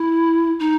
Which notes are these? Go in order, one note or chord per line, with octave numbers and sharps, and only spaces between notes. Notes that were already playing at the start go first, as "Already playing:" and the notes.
Already playing: E4
D#4